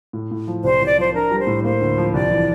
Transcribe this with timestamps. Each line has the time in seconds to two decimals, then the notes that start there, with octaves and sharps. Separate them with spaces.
0.13 A2
0.31 A2
0.47 F3
0.64 C2 C5
0.81 C2
0.86 D5
0.98 F3 C5
1.14 D4 A#4
1.31 G3
1.39 C5
1.47 A2
1.64 A#3 C5
1.81 D2
1.98 F3
2.14 C2 D5
2.31 E3